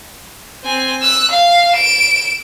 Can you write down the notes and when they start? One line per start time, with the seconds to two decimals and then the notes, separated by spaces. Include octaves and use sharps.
0.64 C4 G#5
1.02 E6 F#6
1.31 F5
1.73 D7 E7